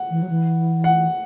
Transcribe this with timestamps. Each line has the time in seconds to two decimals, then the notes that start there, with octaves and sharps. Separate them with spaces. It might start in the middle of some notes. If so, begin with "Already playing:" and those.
Already playing: F#5
0.10 E3
0.22 F#3
0.29 E3
0.84 F#5